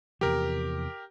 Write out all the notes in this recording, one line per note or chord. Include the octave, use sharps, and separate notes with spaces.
E2 C3 F3 G4 A#4